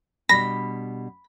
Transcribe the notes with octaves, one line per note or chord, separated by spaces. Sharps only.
B2 G3 D4 B5 A#6